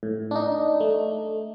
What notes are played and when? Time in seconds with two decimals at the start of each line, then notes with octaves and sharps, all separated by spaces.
0.03 A2
0.31 D4 D#4
0.80 A3